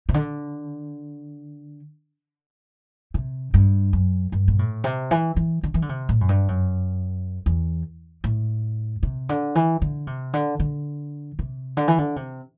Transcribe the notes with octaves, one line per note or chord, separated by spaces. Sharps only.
C3
D3
C3
G2
F#2
G2
B2
A2
C3
E3
E3
D3
E3
D3
C3
A2
F#2
G2
F#2
E2
A2
C3
D3
E3
D3
C3
D3
D3
C3
D3
E3
D3
C3